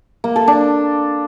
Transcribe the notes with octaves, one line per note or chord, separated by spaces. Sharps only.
A#3
A4
D4